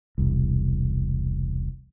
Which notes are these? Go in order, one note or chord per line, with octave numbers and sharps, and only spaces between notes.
E1 C2